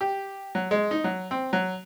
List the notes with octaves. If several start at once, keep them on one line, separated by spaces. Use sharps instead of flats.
G4
F#3
G#3
D#4
F#3
C4
F#3